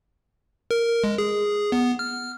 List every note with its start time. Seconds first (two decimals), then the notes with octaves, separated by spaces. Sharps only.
0.71 A#4
1.04 G#3
1.18 G#4
1.72 B3
1.99 F6